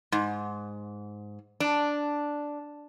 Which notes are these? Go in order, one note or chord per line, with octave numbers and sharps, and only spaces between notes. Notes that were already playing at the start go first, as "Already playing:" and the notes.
G#2
D4